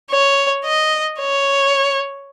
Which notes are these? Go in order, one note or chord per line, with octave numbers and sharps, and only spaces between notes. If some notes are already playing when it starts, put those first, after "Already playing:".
C#5
D#5
C#5